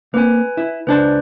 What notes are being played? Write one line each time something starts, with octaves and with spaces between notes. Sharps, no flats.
A#3 C4 B4 G#5
E4
C#2 D4 B4 C5 D5 A5